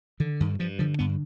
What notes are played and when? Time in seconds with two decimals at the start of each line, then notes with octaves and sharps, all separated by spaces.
0.20 D3 D#3
0.40 G2 D#3
0.59 G2 F3
0.79 D3 F3
0.99 G2 B3